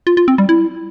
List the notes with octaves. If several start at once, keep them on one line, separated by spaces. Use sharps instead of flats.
F4
F4
C4
G3
E4